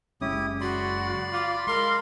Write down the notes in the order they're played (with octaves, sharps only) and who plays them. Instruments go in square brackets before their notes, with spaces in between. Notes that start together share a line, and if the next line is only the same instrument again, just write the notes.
[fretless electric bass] F#1 G#3 C#4 [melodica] E4 G4 D#6
[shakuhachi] F#4 [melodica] D5 B5 C6
[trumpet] F4 [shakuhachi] D6
[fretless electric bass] G#3 [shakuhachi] A#4 [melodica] F5 B5 [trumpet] C6